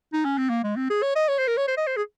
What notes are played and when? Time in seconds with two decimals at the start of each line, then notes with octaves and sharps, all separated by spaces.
0.13 D#4
0.25 C#4
0.38 C4
0.49 A#3
0.64 G#3
0.76 C4
0.90 G#4
1.02 C#5
1.16 D#5
1.28 C#5
1.38 C5
1.47 A#4
1.57 C#5
1.68 C5
1.77 D#5
1.87 C5
1.96 G#4